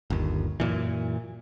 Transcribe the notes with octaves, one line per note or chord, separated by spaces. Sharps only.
G1 D#2
F#2 A#2 E3